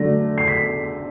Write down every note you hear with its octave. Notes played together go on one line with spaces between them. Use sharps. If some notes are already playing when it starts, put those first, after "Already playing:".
Already playing: D3 F#3 A3 D4 A#6
C7
B6